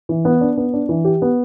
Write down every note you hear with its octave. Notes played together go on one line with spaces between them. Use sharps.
E3
B3
D4
B3
D4
E3
G4
B3